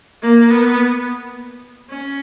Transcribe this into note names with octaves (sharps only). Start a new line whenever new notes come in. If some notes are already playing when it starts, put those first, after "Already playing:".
A#3
B3
C#4